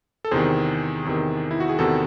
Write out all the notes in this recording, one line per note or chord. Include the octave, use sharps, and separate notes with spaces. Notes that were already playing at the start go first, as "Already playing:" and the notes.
A4
E2 C3 D#3 G#4 C5
E2 C3 D#3
E4
F#4
G#4
E2 C3 D#3 F#4 A4